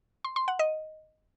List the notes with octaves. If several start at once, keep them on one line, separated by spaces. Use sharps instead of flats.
C6
C6
F#5
D#5